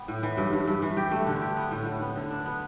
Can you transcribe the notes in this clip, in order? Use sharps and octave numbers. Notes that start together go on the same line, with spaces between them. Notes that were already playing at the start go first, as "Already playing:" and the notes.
Already playing: B3 G4
A2
E3
G2
G2
G2
E3
G4
A3
D3
G4
B3
A2
A2
B3
D3
D4
B3